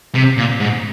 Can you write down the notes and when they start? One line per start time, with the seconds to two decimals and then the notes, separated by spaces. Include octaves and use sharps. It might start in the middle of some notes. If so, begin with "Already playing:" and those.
0.15 C3
0.38 A#2
0.60 G#2